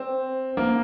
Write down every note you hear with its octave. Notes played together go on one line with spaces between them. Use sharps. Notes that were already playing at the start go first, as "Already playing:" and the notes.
Already playing: C4
A#3